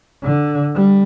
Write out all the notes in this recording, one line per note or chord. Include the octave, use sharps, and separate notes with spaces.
D3
G3